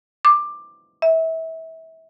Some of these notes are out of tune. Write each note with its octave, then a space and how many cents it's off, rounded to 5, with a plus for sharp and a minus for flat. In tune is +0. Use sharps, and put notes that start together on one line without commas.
D6 +15
E5 -30